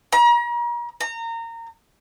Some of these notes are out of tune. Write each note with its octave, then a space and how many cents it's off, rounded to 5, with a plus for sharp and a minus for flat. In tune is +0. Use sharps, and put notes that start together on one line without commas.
A#5 +40
A#5 -25